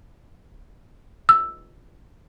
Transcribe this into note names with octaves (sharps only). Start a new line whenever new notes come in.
E6